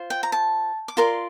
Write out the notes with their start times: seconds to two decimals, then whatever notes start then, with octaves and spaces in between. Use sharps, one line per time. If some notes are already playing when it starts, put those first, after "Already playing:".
Already playing: F4 C5
0.10 G5
0.23 A#5
0.32 A5
0.88 D6
0.97 F4 A#4 D5 C6